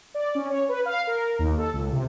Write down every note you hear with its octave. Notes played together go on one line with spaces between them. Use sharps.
D5
C#4
C#5
B4
F5
A#4
D#2
A4
C#2
C3